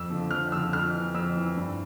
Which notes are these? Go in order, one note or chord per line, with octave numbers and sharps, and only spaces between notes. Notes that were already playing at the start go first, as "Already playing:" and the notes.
Already playing: F2 E6
D3 F3
F2 F6
D3 F3 E6
F2 F6
E3
F2 E6
E3
G2